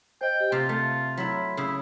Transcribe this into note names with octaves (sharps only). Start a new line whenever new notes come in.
C5 D#5 G5
G4
C3 F4 C6
A3 F4
F#3 E4 B5
C#3 E4